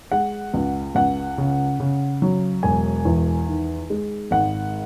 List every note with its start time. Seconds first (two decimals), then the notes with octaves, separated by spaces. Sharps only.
0.12 G#3 F#5
0.54 C#2
0.95 C#2 F#5
1.38 C#3
1.80 C#3
2.22 F#3
2.63 E1 G#5
3.05 E2
3.48 D#3
3.90 G#3
4.31 G#1 F#5